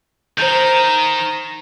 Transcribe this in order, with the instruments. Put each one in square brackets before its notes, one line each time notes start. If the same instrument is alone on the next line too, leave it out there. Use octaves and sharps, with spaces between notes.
[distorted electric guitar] D#3 [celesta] C5 G6 [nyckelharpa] A#5